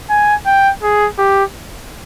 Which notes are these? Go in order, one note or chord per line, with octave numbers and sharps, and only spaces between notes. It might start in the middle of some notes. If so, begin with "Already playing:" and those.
G#5
G5
G#4
G4